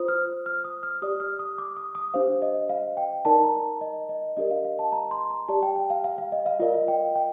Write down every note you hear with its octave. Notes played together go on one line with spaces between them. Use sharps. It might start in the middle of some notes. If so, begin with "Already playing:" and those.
Already playing: F4 C5 D#6
F6
F6
D#6
F6
G4 D5 D#6
F6
D#6
D6
D#6
D#6
D4 G4 C5 F5
D#5
F5
G5
D#4 A#4 D5 A5
A#5
D#5
D#5
D4 G4 A#4 D5 D#5
F5
F5
A5
A#5
C6
A#5
G4 D5 A5
G5
G5
F5
F5
F5
D#5
F5
F4 A#4 D5 D#5
F5
G5
G5